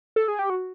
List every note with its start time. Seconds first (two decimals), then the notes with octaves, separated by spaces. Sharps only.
0.16 A4
0.28 G#4
0.39 G4
0.50 F#4